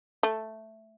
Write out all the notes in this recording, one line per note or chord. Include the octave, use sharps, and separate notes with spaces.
A3